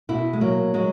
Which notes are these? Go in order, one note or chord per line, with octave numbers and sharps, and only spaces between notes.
B2 E4
G#3
F#3 A#3
F#3 G#3